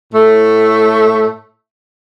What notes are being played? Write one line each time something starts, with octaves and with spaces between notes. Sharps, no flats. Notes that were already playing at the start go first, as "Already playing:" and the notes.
A2 A3